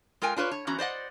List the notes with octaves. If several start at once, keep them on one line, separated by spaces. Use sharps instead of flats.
G#3 F4 A#4 G5 G#5
D4 F4 B4 C#5
C#5
E2 E3 C#4 F#4 A#5
C5 D5 D#5 F#5